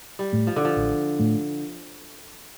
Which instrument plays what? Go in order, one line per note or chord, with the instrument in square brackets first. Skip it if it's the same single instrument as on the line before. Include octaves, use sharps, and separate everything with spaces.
[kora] G3
[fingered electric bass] A2 A3
[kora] F3
D3
F3
[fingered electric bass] A1
A2 A3